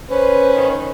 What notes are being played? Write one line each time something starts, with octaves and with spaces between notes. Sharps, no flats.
C#4 B4 C5
D#3